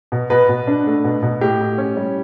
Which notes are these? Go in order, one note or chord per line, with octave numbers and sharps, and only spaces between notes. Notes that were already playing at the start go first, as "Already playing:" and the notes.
B2
B2 B4
B2
D4
A3
B2
B2
A2 G4
A2
C#4
G3